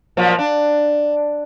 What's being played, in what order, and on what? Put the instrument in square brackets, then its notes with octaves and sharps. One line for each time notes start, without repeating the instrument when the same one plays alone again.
[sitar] A#2 F3 F#3
D4